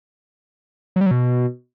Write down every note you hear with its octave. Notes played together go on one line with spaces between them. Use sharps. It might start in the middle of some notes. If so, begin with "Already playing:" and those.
F#3
G3
F#3
B2